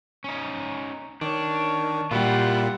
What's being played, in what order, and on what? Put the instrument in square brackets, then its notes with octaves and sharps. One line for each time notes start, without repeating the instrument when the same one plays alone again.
[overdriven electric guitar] C#4 D#4
[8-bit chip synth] D#3 [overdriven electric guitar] D4 [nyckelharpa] C#5
[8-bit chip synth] A#2 G3 [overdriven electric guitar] E4 F4 [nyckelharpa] G4 F#5